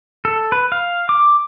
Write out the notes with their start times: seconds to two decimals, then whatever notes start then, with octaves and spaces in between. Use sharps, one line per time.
0.25 A4
0.52 B4
0.72 F5
1.09 D6